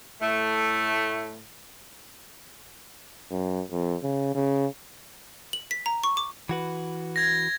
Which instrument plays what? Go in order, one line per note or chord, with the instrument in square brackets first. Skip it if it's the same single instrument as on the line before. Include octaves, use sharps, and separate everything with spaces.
[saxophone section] A2 A3
[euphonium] F#2
F2
C#3
C#3
[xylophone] F#7
B6
A#5
C#6
D6
[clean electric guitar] E3 F#4 B4
[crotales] G#6 A#6